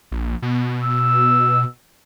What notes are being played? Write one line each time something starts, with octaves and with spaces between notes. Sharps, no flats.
A#1
B2
E6